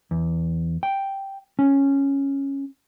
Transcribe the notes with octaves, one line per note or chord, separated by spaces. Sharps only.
E2
G5
C#4